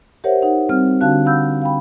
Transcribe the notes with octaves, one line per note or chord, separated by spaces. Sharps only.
G4 A#4 C5 C#5 E5 F#5
D#4 F#5
G3 C4 F6
D3 D4 F#4 F5 A5 F#6
F5 F#5 B5 E6 G6
F5 G5 B5